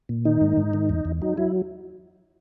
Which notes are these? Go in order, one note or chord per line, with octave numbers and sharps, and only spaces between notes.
A#2
D#3 D#4
G#2
G#2
D#3
E2
E2
F#3 D#4
F#3 E4